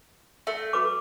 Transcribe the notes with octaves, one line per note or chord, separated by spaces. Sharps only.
A3 E5
F#4 B4 D6